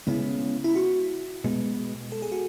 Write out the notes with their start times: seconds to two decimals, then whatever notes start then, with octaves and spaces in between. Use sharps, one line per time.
0.06 C#3 G#3 B3 E4
0.64 E4
0.76 F#4
1.44 B2 G#3 B3
2.12 A4
2.22 G#4
2.32 F#4